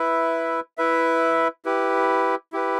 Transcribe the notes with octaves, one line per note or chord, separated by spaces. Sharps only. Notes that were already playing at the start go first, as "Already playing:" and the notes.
Already playing: E4 B4 E5
E4 B4 E5
E4 G4 B4
E4 G4 B4